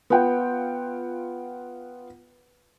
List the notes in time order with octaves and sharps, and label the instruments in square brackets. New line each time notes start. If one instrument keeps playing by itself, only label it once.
[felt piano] B3 F4 F#5 G5